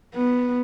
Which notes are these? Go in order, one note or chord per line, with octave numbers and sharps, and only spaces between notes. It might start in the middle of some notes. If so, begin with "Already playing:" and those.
B3